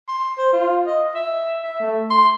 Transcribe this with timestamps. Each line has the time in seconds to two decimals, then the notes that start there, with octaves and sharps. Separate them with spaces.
0.08 C6
0.38 C5
0.53 F4
0.86 D#5
1.15 E5
1.63 E5
1.80 A3
2.10 C6